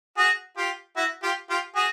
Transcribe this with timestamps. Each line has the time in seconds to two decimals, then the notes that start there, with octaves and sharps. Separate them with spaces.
0.18 F#4 G#4
0.57 F4 G4
0.97 E4 F#4
1.23 F4 G4
1.50 F4 G4
1.76 F#4 G#4